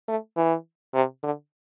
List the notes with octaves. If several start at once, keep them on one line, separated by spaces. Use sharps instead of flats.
A3
E3
C3
D3